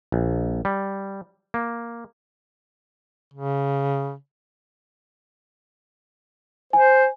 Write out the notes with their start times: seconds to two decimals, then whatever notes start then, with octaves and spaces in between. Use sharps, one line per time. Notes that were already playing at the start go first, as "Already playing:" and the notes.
0.12 A#1
0.65 G3
1.54 A#3
3.34 C#3
6.73 C5 G#5